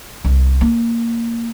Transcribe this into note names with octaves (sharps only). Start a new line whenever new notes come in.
C2
A#3